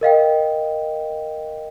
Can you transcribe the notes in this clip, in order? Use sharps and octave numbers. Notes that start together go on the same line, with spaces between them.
A#4 D#5 F5 G5